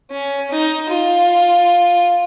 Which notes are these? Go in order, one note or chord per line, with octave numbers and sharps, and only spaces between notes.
C#4
D#4
F4